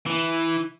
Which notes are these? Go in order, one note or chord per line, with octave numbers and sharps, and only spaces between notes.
E3